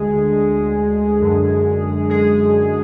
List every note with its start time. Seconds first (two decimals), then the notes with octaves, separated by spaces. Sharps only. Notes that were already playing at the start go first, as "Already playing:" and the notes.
Already playing: D2 D3 G#3 G#4
1.21 F#2 D3
2.10 G#3 G#4